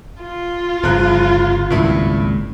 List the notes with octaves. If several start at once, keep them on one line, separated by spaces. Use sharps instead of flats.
F4
G1 C#3 F3 A#5 F#6
G#1 C#2 G2 A#2 E4